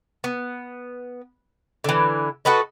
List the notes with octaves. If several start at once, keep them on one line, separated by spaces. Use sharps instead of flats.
B3
D3 E3
F#4 A4 B4 D#5